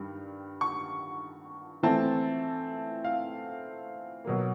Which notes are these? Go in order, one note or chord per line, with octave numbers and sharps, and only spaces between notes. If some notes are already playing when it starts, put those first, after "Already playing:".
Already playing: G2 D#3 G3
C#6
E3 A3 C4 E4 A5
F5
B2 F#3 A#3